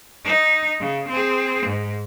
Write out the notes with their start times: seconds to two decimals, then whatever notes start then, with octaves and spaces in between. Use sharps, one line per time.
0.25 D#4
0.80 C#3
1.09 C4 G#4
1.66 G#2